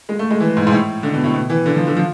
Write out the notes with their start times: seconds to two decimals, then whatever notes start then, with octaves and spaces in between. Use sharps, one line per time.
0.09 G#3
0.19 A3
0.31 G#3
0.40 E3
0.57 G#2
0.67 G#2
0.72 A2
1.03 D3
1.14 B2
1.24 A2
1.34 B2
1.50 E3
1.66 D3
1.76 F3
1.87 D3
1.97 F3